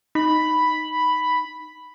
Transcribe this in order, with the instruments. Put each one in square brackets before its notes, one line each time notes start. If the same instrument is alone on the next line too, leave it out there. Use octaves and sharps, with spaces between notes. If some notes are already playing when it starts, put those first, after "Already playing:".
[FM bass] D#4 [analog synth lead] B5